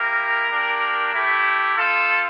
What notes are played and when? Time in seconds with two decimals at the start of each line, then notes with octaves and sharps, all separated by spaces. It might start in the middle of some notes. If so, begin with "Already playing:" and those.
Already playing: A#3 E4 G4 A#4
0.49 A#3 D4 G4
1.13 A3 E4 G4
1.77 C4 F4 A4